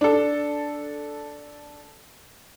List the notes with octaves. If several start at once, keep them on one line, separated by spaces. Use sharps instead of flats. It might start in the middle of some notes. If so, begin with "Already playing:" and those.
D4 A4